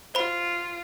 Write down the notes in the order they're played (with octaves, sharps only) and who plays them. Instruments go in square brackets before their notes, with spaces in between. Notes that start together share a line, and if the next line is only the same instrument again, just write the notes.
[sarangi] F4 [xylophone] C5 B5